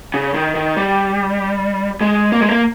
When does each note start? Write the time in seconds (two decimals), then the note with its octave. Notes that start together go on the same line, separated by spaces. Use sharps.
0.14 C#3
0.34 D#3
0.55 D#3
0.77 G3
2.01 G#3
2.32 A#3
2.41 G#3
2.49 A#3